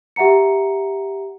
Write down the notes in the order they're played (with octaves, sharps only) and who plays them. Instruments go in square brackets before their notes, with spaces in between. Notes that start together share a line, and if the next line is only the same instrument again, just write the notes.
[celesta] G4 E5 F#5 A#5 C#7